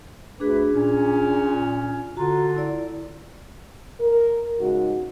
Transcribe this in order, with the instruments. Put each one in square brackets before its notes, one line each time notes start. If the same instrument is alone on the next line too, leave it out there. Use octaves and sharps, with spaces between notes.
[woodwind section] D2 B4 [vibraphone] D4 G#4
[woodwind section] A#2 C#4
[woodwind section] D3 F4 [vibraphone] F#4 A#5
[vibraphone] E4 D5
[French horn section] A#4
G#2 C#3 G#3 D#4 F#4